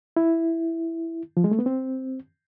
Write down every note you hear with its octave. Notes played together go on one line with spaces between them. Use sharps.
E4
F3
G#3
A3
B3
C4